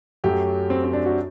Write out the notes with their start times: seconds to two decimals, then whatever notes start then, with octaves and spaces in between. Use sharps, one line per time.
0.24 F#2 F#3 A3 G4
0.70 C4
0.84 C4
0.93 D4
1.06 F#4